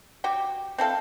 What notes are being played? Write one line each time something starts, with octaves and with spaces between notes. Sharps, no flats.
F#4 G4 G5
C4 E4 A4 F5